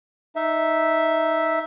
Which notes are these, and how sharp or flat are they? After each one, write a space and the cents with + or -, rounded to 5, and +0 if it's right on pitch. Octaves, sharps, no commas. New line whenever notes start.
D#4 +0 E5 -5